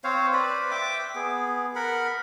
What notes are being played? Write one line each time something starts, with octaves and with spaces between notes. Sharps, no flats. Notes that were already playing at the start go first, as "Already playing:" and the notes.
C4 C5 C#5 F5
B4 C5 D5 B5
E5 G5 D6
B3 G#4
A#4 F#5 B5